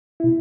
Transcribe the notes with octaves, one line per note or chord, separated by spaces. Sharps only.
B2 E4